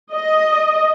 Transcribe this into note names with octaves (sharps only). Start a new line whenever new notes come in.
D#5